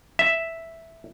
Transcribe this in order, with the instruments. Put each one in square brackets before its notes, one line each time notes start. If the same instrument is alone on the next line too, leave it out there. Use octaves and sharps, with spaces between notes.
[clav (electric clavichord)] E5